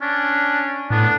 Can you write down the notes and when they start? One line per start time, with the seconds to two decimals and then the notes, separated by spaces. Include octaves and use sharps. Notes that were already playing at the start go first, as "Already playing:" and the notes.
0.01 C#4 D4
0.90 A2 B3 D4